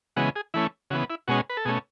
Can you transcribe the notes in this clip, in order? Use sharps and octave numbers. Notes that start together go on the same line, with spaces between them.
C#3 E3 G#3 B3 F#4
G#4
E3 A3 C#4 E4
C#3 E3 B3 F#4
E4
B2 G#3 C#4 F#4
B4
A4
B2 A3 C#4 G#4